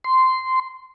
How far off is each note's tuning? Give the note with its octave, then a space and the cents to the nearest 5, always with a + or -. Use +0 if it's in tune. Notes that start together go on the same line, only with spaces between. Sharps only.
C6 -10